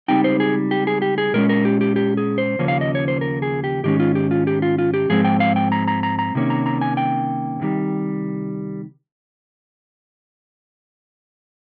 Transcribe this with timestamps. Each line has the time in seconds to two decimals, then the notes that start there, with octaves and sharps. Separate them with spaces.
0.08 C#2 C#3 G3 C4 D#4 G5
0.24 C5
0.40 G#4
0.71 G4
0.87 G#4
1.02 G4
1.18 G#4
1.33 A#2 G#3 C#4 A#4
1.49 A#4
1.65 G4
1.81 G4
1.96 G4
2.17 G#4
2.38 C5
2.59 D#2 C#3 F3 A#3 C#4
2.68 F5
2.81 D#5
2.95 C#5
3.08 C5
3.21 A#4
3.42 G#4
3.64 G4
3.84 G#2 D#3 G#3 C#4 G4
4.00 F4
4.15 G4
4.31 F4
4.47 G4
4.62 F4
4.78 F4
4.94 G4
5.09 G#2 F3 G#3 C4 G#4
5.24 G5
5.40 F5
5.56 G5
5.72 A#5
5.88 A#5
6.03 A#5
6.19 A#5
6.34 C2 C3 D#3 A#3 C#4
6.50 A#5
6.66 A#5
6.81 G#5
6.97 G5
7.60 C2 C3 D#3 G3